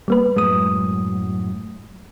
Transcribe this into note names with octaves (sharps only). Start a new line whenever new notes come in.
G3 A#3 B4
F#2 A2 G#3 D#6